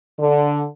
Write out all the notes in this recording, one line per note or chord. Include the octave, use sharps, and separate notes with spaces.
D3